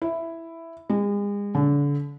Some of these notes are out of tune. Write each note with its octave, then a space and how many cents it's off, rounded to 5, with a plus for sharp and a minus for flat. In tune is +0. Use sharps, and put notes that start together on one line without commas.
E4 +5
G#3 -40
D3 -35